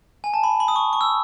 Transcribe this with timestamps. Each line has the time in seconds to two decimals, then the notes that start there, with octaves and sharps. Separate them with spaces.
0.24 G#5
0.34 A5
0.43 B5
0.60 B5
0.68 D#6
0.76 C#6
0.93 C#6
1.01 E6